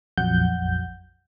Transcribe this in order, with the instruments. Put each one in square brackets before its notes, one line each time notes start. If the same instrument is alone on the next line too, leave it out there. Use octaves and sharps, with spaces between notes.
[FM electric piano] A#1 F2 F#3 F#5 G6